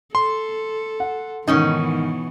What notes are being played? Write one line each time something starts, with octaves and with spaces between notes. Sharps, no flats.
A4 C6
F#5
G#2 B2 D#3 E3 B3 C#4 D#4